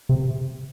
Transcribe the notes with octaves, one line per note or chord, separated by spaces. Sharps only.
C3